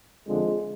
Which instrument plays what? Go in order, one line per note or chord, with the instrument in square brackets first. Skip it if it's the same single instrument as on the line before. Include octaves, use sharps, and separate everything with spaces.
[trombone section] F2 D3 F3 G#3